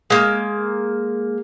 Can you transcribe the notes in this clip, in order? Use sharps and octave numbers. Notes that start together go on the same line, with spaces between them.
G#3 A#3